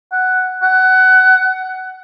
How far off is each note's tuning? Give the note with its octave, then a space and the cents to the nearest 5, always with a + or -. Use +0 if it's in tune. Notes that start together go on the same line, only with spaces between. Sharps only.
F#5 +5
F#5 +20